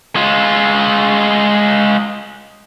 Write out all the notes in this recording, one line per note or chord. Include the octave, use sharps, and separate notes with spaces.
G#3 F4